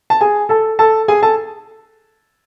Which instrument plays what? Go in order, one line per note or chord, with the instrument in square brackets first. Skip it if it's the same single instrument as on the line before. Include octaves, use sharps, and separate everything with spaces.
[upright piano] A5
G#4 G#5
A4 A5
A4 A5
G#4 G#5
A4 A5